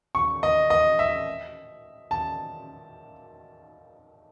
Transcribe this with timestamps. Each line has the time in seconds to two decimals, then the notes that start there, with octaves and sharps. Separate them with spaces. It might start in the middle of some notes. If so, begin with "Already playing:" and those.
0.15 C#6
0.43 D#5
0.70 D#5
0.99 E5
2.11 A5